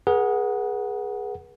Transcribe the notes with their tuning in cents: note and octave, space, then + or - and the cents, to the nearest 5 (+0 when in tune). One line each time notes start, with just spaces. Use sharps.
G#4 +0 B4 -45 F#5 +0